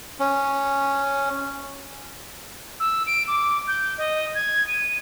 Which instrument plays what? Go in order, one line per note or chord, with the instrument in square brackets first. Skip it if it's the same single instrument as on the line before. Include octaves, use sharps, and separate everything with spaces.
[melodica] C#4
[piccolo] E6
D7
D6
G6
D#5
G#6
D#7